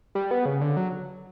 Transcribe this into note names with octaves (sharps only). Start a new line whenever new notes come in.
G3
B3
C#3
D3
F#3